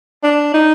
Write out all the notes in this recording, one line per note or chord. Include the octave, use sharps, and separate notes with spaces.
D4
D#4